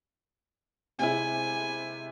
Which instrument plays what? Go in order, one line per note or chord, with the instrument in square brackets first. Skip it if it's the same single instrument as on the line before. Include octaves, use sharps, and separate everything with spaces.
[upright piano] C3 G#3 E4 [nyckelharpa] G#5